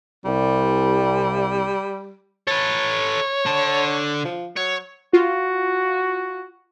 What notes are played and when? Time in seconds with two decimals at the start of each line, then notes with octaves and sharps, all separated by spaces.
0.25 C2 G3
2.47 A4 B4 C#5
3.46 D3 A5
4.25 F3
4.57 F#3 C#5
5.13 F4 F#4